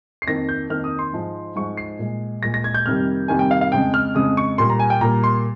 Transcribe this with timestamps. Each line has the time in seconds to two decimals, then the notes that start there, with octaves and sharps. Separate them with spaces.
0.22 C7
0.27 F2 D#3 A#3 A#6
0.49 G6
0.70 F2 D#3 A#3 F6
0.84 D#6
0.99 C6
1.13 G#2 F3 G#3
1.56 G#2 F3 G#3 C#6
1.77 C7
1.99 A#2 G#3
2.42 A#2 G#3 A#6
2.54 A#6
2.64 G#6
2.74 G6
2.86 F2 C3 D#3 G3 A#3 F6
3.28 F2 C3 D#3 G3 A#3 G#5
3.39 G5
3.51 F5
3.61 F5
3.72 F2 C#3 G#3 G5
3.94 F6
4.15 F2 C#3 G#3 D#6
4.37 C#6
4.58 A#2 G3 A#3 C6
4.70 A#5
4.80 G#5
4.90 G5
5.01 A#2 G3 A#3 A#5
5.23 C6